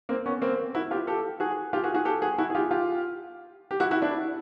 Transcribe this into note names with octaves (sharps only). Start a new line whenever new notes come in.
A#3 C4
B3 C#4
A#3 C4
E4 F#4
F4 G4
G4 A4
F#4 G#4
F4 G4
F#4 G#4
F#4 G#4
G4 A4
F#4 G#4
E4 F#4
G#4
F4 G4
F4 G4
G4
E4 F#4
E4 F#4
D4 E4